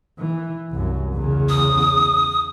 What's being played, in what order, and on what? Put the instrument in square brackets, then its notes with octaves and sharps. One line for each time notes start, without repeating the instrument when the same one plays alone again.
[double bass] E3
C2 F#2
E2 C#3
[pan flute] D#6